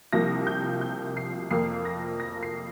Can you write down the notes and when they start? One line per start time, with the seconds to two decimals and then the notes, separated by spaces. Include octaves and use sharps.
0.13 C2 C3 F3 A#3 A#6
0.47 G6
0.81 G6
1.17 C7
1.51 F2 F3 A#3 C7
1.85 A#6
2.20 A#6
2.43 C7